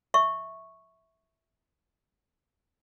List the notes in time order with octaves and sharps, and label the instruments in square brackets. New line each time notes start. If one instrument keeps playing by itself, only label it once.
[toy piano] E5 C#6